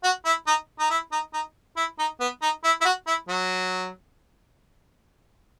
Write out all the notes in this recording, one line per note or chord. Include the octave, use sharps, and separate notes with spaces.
F#4
E4
D#4
D#4
E4
D#4
D#4
E4
D#4
B3
D#4
E4
E4
F#4
E4
F#3